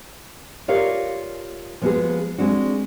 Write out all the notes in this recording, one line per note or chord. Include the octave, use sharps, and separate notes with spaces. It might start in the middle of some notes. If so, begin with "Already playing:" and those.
F4 G4 A#4 C#5 D5 F5
F3 G#3 B3 F4 F#4 G#4
G#3 C4 D4 F#4